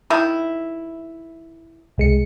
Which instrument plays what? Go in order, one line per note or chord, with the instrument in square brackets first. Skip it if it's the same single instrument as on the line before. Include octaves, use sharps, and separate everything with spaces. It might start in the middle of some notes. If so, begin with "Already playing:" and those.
[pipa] D#3 E4
[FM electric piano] C2 G#3 C#7